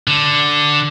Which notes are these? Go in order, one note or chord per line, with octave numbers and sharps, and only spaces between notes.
D3